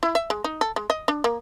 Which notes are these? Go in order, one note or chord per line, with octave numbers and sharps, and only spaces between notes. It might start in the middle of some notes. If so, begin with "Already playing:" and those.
E4
E5
G#3
D#4
A4
G#3
D#5
D4
A#3